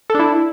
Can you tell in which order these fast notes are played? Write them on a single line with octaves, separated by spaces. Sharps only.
A4 D4 E4